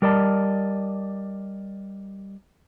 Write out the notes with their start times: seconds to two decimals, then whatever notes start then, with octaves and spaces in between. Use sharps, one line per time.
0.02 G3 A#4 D5 D#5 A5